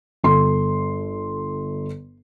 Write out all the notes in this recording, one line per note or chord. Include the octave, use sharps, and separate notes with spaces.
G1 A4 C6